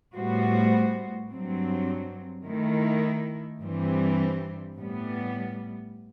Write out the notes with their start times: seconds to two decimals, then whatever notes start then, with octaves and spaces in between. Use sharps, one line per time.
0.14 A2 G3 B3 F#4 C5
1.30 G2 F#3 C4
2.46 D#3 A3 E4
3.60 G2 E3 G3 C4
4.77 A2 G3 B3